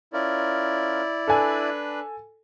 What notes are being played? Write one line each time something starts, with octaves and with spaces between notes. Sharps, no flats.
C#4 E4 F4 A#4 D5
D4 A4 B4 G#5